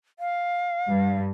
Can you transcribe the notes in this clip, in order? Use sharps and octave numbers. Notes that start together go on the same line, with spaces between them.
F5
G2